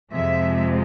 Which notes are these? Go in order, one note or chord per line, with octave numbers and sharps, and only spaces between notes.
F2 C3 F3 G#3 E5